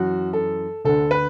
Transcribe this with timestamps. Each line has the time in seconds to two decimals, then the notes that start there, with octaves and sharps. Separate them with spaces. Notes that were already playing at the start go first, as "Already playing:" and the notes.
Already playing: F#2 E3 F#4
0.33 A4
0.85 D2 D3 A4
1.11 B4